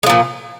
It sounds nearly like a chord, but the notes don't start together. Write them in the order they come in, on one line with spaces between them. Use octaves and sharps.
G#3 F3 A#2